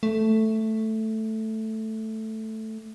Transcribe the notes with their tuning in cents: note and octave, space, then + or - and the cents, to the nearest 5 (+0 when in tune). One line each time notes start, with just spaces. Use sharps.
A3 +0